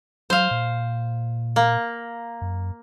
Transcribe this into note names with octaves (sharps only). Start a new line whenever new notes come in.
F#3 C5 F5
A#2
A#3
F#2